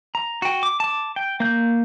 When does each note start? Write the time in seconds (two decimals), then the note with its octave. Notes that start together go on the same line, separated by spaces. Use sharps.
0.15 A#5
0.42 F#4 G5
0.63 D6
0.80 A5 D6
1.16 G5
1.40 A#3 G6